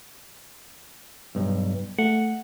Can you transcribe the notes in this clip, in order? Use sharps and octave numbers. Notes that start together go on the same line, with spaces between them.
B1 G2
A3 F#5